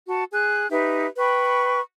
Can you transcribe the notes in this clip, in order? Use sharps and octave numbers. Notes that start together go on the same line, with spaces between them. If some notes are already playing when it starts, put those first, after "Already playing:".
F#4 A5
G#4 F#6
D#4 G4 B4 E5
B4 G5 B5 C#6